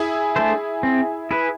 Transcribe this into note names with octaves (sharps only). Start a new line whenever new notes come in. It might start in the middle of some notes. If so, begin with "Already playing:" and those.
Already playing: E4 G#4
A3 D4 A4 C5
C4
E4 G#4 B4